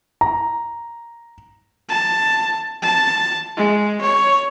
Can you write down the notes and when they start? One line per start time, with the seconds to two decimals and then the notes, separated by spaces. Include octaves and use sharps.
0.21 A#5
1.89 A5
2.82 A5
3.56 G#3
4.01 C#5